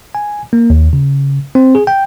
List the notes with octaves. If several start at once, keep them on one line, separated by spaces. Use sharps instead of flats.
G#5
A#3
D#2
C#3
C4
G#4
G5